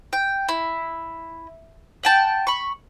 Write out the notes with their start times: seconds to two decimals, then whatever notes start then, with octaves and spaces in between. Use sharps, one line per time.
0.13 G5
0.49 E4
2.03 F#5 G5 A5
2.47 B5 C#6